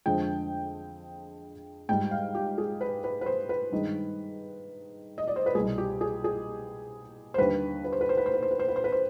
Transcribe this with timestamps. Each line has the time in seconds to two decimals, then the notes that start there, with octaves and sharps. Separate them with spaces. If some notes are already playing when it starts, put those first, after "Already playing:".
0.06 F2 D3 F3 G#3 G5
1.89 G#2 G3 G5
2.11 F5
2.35 G4
2.58 G#4
2.81 B4
3.04 B4
3.21 B4
3.26 C5
3.49 B4
3.72 G2 D#3 G#3
5.18 D#5
5.28 D5
5.36 C5
5.46 B4
5.55 C2 B2 G3 G#4
5.78 G4
6.01 G#4
6.24 G#4
7.34 C5
7.38 D#2 D3 G3 B4
7.84 B4
7.93 C5
8.01 B4
8.09 C5
8.17 B4
8.26 C5
8.34 B4
8.43 C5
8.51 B4
8.60 C5
8.68 B4
8.76 C5
8.84 B4
8.92 C5